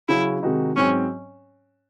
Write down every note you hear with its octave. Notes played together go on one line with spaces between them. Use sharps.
C#3 F#3 C#4 E4 F#4
C3 D#3 G#3 D#4 F#4
G#2 F#3 C4 C#4